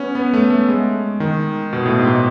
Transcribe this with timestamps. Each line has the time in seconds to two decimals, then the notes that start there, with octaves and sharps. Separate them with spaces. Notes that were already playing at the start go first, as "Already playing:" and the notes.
Already playing: B3 C#4
0.15 B3
0.34 A3
0.50 A3
0.68 G#3
1.20 D#3
1.73 B2
1.85 A2
1.99 G#2
2.12 A2